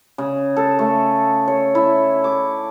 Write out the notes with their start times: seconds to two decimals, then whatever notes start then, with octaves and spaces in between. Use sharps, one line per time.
0.18 C#3
0.57 A4
0.79 A3
1.48 C#5
1.75 E4
2.24 D6